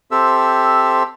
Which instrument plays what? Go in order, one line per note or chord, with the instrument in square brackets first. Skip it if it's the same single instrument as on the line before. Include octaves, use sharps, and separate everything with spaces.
[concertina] C4 G4 A4 C5 E5 E6